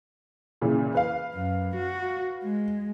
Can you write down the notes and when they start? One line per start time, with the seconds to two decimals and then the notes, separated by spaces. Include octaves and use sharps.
0.61 A#2 C#3 E3
0.95 B4 F5
1.35 F#2
1.76 F#4
2.43 G#3